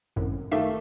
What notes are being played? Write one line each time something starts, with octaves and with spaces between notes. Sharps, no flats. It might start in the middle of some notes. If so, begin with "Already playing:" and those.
G#1 F#2 A2
D#3 A3 G4 E5 F5